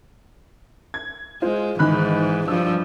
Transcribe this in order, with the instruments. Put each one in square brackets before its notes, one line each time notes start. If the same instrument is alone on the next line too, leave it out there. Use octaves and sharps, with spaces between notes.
[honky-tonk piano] G#6
[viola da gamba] G#3 [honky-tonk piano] F4 C5
[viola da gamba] G#2 E3 [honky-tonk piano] D#3 B5 F#6
[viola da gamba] G2 F3 G3 [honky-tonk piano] E6